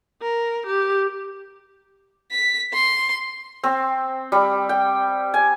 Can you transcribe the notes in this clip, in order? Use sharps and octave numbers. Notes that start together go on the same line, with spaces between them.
A#4
G4
B6
C6
C4
G3
G5
G#5